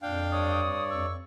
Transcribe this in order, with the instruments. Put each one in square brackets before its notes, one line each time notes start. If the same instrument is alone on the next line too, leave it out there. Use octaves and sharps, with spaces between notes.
[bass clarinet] F2 [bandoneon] A#2 [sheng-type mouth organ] D4 F5 G5
[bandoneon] G2 C#5 D5 [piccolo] D#6
[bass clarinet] F2 [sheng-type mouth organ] C#6 [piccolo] E6